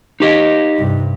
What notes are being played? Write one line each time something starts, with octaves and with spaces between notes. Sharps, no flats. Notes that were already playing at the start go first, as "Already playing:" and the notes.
D#4 G4 D#5
G2 C3